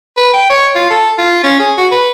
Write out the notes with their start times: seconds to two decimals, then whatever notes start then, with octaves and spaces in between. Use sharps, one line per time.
0.17 B4
0.34 G5
0.50 C#5
0.75 F4
0.91 A4
1.18 F4
1.44 C#4
1.60 G#4
1.78 F#4
1.92 B4